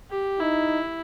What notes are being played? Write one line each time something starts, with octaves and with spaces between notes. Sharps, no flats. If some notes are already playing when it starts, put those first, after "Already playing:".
G4
D#4 E4